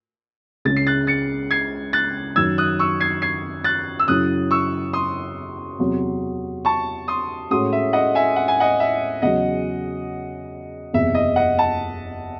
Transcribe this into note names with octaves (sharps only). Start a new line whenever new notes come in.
C#2 C#3 G#3 C#4 A6
C7
F#6 A6
A6 C#7
G#6 C7
F#6 A6
F#2 D#3 F#3 E6 G#6
D#6 F#6
C#6 E6
G#6 C7
G#6 C7
F#6 A6
E6
F#2 C#3 F#3 C#4 E4 D#6 F#6
C#6 E6
C6 D#6
E2 C3 F#3
A5 C#6
C6 D#6
A2 G#3 C#4 F#4 C6 D#6
E5
D#5 F#5
E5 G#5
F#5
G#5
D#5 F#5
E5
E2 C#3 F#3 D#5 F#5
F#1 E2 C3 E5
D#5
D#5 F#5
F#5 A5